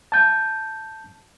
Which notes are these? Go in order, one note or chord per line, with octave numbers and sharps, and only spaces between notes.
A5 G6